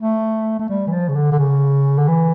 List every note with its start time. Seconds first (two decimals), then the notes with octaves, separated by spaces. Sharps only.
0.01 A3
0.59 A3
0.69 G3
0.87 E3
0.93 F3
1.09 C#3
1.15 D3
1.32 D3
1.39 C#3
1.98 D3
2.08 E3